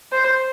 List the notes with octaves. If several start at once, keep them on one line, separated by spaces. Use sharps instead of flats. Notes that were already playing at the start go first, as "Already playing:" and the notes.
C5